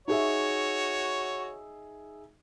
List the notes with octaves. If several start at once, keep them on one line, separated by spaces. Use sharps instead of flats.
D#4 F#4 G#4 C#5 E5